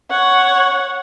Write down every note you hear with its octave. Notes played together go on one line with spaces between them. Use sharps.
C#5 F#5